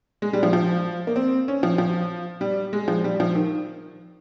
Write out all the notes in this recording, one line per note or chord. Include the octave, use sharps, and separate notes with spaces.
G#3
G3
F3
F3
A#3
C4
C#4
F3
F3
G3
G#3
F3
G3
F3
D#3